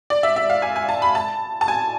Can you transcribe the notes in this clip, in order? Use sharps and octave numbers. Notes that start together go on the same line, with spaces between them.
D5
E5
E5
F5
G#5
G#5
A5
B5
A5
A5
G#5